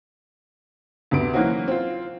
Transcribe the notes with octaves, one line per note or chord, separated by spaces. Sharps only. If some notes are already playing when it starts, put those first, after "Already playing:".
D2 C3 B3 D7
E3 F#3 A#3 C4 C#4 F#4
C4 F4